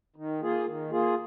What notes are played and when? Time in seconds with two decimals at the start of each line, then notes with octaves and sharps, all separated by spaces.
0.16 D#3
0.41 A#3 F4 G#4
0.66 D#3
0.91 A#3 F4 G#4